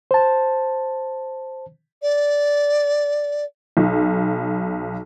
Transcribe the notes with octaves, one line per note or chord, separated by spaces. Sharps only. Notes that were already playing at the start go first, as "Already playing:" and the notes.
C5 A5
D5
B1